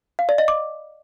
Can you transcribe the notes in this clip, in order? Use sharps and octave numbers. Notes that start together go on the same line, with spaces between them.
F5
D5
D#5
D6